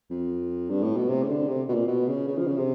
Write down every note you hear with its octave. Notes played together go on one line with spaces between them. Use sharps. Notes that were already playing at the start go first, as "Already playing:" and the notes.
F2
G2
A2
B2
C3
C#3
D3
C3
B2
A#2
B2
C#3
C#3
F3
C#3
C3